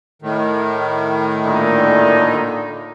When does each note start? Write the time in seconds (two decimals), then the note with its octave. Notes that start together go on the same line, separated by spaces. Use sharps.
0.22 A2 D#3
1.46 A#2 D3 D#4